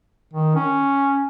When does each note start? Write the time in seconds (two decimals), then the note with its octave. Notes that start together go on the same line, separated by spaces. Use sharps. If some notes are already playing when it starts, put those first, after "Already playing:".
0.33 D#3
0.55 C#4